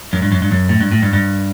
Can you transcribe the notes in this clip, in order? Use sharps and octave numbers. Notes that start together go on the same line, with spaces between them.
F#2
G2
F#2
G2
F#2
A2
G2
A2
G2
G2